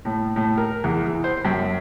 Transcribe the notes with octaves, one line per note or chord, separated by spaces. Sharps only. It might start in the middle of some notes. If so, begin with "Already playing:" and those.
A2
A2
A#4
E2
E3
C5
F#2